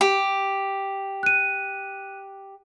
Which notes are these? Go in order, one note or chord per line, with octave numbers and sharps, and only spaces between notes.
G4
F#6 D#7